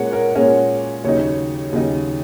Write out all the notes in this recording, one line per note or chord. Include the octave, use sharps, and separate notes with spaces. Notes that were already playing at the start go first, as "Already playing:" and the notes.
Already playing: A#2 G#3 C#4 A#4 C#5 F#5
A#4
A#2 G#3 C#4 A#4
D#2 C#3 F#3 D#4 C#5
D#2 C#3 F#3 D#4